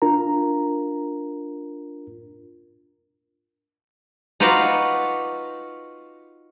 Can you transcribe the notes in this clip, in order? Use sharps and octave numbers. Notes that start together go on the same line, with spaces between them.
D4 F4 A#4 A#5
D#4 F4 F#4 B4 D5